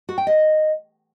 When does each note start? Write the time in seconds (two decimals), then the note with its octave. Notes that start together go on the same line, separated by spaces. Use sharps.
0.09 F#4
0.18 G5
0.27 D#5